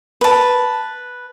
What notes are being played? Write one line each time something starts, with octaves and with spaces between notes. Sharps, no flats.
B4 A5